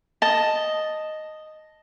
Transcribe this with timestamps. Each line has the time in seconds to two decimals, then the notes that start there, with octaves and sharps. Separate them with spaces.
0.22 D#5 A5